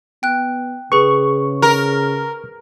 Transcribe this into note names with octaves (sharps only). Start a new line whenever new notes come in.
B3 G5 F#6
C#3 G#4 B4 C#6
A#4